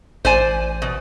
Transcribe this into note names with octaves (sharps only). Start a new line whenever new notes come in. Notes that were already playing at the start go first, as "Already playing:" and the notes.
A1 C5 D5 G#5
B2